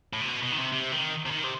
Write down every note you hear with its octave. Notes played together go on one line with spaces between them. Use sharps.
A2
C3
B2
B2
D#3
C3
C3
D#3
C3
D#3
C3